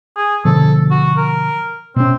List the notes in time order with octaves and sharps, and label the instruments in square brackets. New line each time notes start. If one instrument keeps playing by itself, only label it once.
[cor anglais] G#4
[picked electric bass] B2 D3 F3 [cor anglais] A4
[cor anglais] F#4
A#4
[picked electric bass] B2 C#4 [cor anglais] C4